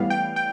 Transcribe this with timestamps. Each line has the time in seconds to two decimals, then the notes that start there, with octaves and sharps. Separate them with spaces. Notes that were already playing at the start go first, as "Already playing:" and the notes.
Already playing: A2 E3 G3 B3 F5
0.10 G5
0.36 G5